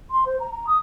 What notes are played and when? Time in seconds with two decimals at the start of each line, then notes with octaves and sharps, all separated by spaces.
0.11 C6
0.26 C5
0.40 A#5
0.51 A#5
0.67 D#6